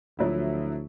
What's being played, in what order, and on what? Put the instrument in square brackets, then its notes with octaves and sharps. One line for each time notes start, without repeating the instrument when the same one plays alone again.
[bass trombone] D2 [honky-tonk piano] F3 F#3 E4